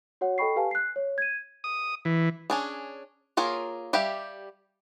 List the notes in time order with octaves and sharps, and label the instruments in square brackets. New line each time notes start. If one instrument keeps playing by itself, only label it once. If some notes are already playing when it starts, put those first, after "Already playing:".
[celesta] F#4 C#5 F#5
A4 D#5 G5 B5 C#6 C7
G4 B4 F5 G#5 A5
F#6 C7
C#5
G#6 D#7
[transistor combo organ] D#6
E3
[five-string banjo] C#4 D4 G#4
A#3 F4 G#4 A#4 C#5
G3 G4 E5 F5 G5